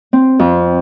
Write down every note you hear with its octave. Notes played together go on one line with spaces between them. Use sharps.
C4
F2